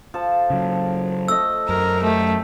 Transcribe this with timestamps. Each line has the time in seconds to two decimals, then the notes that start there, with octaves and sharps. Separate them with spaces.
0.14 F3 A4 A5
0.50 C#3 F#3
1.28 A3 D#5 E6
1.69 F#2 A#4
2.03 A3 G4 G5